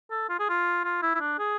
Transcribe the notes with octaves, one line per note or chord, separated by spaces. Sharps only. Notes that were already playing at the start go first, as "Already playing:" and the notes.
A4
F4
G#4
F4
F4
E4
E4
D4
G#4